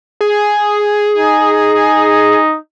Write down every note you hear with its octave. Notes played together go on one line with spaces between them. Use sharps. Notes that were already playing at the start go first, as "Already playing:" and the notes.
G#4
D#4